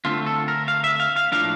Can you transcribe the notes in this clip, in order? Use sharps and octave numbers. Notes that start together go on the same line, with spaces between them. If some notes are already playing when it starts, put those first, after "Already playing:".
D3 A3 C4 F4
A4
A#4
F5
E5
F5
F5
A2 F3 A#3 D4 F5